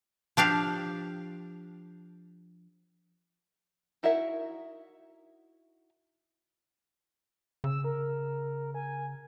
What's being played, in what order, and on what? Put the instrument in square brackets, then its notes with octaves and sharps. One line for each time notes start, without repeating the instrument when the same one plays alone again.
[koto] F3 D4 G4 F5
[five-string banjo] D#4 E4 F#4 A#4 E5
[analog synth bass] C#3 [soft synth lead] E6
[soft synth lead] A#4
G#5